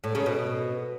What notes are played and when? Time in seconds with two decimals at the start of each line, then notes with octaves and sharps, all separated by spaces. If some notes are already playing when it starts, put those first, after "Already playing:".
0.04 A2
0.15 C#3
0.26 B2